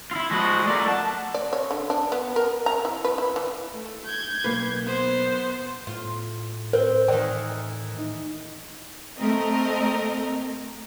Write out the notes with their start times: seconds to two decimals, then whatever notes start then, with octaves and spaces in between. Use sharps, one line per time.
0.11 E4 F4
0.31 F3 G#3 F#4
0.67 A3 A#4 D5
0.88 F#5 A5
1.34 D5
1.53 C#5
1.71 D3
1.90 D4
2.12 B3
2.36 A#4
2.66 A#5
2.85 E4
3.04 B4
3.18 E4
3.36 E3
3.74 A3
4.06 G6 G#6
4.44 B1 A#3 B4
4.85 B3 C5
5.87 A2 F4
6.73 C4 A#4 B4
7.08 D#3 E3 D5 G5
7.99 D#4
9.18 A3 C4 A#4 D#5